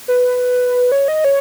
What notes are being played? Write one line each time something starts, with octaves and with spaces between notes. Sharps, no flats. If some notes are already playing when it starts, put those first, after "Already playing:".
B4
C#5
D#5
C#5